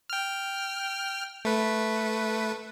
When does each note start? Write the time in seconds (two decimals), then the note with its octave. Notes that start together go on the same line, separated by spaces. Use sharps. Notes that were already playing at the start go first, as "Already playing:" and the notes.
0.10 G5 F6
1.45 A3 B4